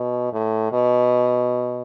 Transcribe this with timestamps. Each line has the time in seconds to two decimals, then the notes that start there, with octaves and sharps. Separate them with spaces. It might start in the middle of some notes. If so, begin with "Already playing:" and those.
Already playing: B2
0.33 A2
0.72 B2